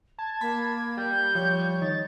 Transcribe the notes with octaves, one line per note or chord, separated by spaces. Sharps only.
A5 G#6
A#3 B5
G3 G6
F3 C#5
D#3 A6